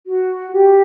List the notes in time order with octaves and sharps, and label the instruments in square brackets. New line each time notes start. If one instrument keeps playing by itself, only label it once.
[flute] F#4
G4